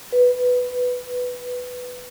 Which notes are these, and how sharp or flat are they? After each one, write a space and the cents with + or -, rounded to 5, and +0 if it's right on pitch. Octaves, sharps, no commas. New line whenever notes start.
B4 +5